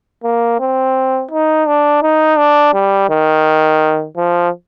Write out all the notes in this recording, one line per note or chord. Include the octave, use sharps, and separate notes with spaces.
A#3
C4
D#4
D4
D#4
D4
G3
D#3
F3